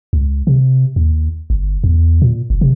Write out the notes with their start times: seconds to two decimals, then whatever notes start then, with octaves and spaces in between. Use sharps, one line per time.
0.13 C#2
0.47 C3
0.96 D#2
1.50 G1
1.84 E2
2.22 A#2
2.50 F#1
2.61 C3